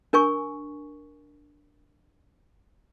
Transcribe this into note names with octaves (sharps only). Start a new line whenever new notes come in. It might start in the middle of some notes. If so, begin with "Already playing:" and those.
D4 A#4 G#5 C#6